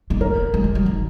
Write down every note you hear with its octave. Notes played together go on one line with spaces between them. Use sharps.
A#3
B3 A#4
G#3
G#3
F#3
D#3